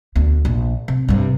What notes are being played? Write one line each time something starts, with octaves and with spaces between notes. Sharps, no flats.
D2 B3
A#1
C3
G2 C3